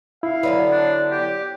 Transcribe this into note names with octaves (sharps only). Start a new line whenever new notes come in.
E4 F5
D3 F#3 B3 D5
D4
G4